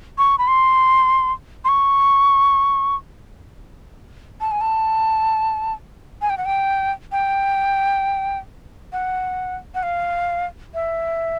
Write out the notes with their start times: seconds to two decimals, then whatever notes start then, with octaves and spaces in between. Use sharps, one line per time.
0.18 C#6
0.38 B5
0.47 C6
1.65 C6
1.68 C#6
4.40 A5
4.51 G#5
4.61 A5
6.21 G#5
6.30 G5
6.38 F#5
6.45 G5
7.12 G5
8.92 F#5
9.74 F#5
9.83 F5
10.74 E5